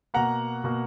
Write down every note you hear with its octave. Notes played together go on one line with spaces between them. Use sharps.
B2 A#3 F#5 A#5
B2 A#3